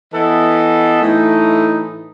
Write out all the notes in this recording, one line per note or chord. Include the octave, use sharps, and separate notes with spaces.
E3 B3 E4 A4 D#5
A2 E3 A3 D#4